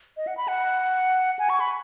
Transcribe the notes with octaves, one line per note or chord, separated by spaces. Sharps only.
D#5
F#5
B5
F#5
G#5
C#6
B5